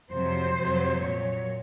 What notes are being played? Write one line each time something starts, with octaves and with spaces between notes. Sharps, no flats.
F2 C3 F#3 C5
F2 C3 F#3
A#2 F#3 C#5